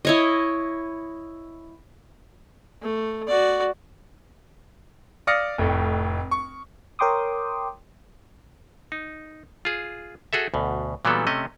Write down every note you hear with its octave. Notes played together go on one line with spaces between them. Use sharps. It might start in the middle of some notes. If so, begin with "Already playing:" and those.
E4 C#5 D#5
A3
F#4 D5
D5 F5 D#6 F6 A#6 C#7
F1 F2 A2
C#6
A#4 C#5 G5 C6 D6 D#6
D#4
F4 G#4
F#4 G#4 A4 E5
D2 B2
A#2 E3 F#3 G3 B3 A4
C3 A3 C#4 D#5